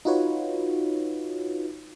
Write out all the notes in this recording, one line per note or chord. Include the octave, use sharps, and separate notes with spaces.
D#4 F4 F#4 B4 C#5